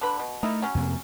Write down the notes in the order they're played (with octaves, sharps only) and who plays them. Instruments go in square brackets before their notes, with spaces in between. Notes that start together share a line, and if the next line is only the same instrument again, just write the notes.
[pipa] D3 B4 B5
B2
[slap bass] A3 [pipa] D#4 E4 A#4
[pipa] F#3 C#4
[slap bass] F2 C3 A#3